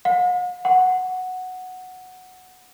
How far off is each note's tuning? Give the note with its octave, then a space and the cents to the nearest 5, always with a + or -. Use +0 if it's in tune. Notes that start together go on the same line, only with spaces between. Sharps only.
F#5 -45
F#5 -5